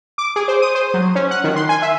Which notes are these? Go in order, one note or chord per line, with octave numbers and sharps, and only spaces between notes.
D6
G#4
C5
D#6
C5
F#3
C#4
F#5
D#3
C6
G#5
E5